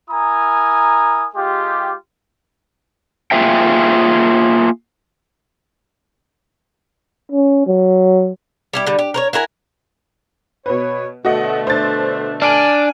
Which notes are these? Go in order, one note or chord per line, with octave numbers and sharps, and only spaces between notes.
E4 A#4 G#5 A#5 D#6
G#3 F4 G4
A#3 B3 F4 G#4 E5 G5
C#4
F#3
G3 E4 G4
D3 G3
G4
A#4 C5 C#5
E4 F#4 A#4 G#5
B2 B4 C#5
B2 D3 A3 F#4 D#5 F#5
D4 C5 A6
D4 G#5 F6 D7 F#7